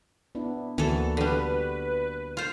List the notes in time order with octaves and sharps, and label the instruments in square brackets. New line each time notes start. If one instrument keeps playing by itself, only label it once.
[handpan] B3 D4 E4
[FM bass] D2 [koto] E3 A4 [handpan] A#3 D4 F#4
[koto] D3 G3 [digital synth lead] B4
[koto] F4 C5